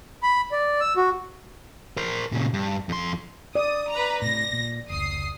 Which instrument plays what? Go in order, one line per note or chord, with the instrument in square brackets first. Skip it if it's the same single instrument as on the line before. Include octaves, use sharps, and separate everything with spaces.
[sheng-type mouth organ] B5
D5
E6
F#4
[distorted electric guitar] A#4 C5
A#2 C#3
G2
F2 C6
[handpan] D5 [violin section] D#6
[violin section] B4 A#5
[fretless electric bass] A2 C3 [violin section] A#6
[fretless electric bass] A#2
[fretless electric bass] F1 C#2 [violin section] D#6 C7